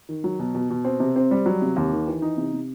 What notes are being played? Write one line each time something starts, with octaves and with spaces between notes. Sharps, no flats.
D#3
F#3
B2
B2
B2
C4
C3
C4
G3
F#3
C3
D#2
D#3
E3
D#4
C3
C3